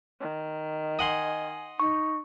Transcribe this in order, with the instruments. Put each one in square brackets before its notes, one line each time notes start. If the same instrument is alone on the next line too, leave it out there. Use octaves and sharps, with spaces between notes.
[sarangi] D#3
[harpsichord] D#5 F#5 C6 [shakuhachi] G#5
[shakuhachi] D#4 [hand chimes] C#6